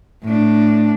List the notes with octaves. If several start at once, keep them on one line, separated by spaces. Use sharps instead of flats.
A2 D4